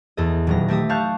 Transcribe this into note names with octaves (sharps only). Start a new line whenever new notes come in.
E2 A4 D#5
D#1 F#3 A#6
A3 G4 E5 D6 D#6
F5 A5 C#6 F#6 G6